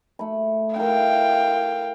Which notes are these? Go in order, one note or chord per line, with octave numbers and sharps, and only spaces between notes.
A3 B5
E4 A#4 F5 G5